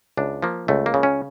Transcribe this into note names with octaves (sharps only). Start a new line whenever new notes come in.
C#2 D4
F3 A#3
C#2 A3
A#3
C#3
C#4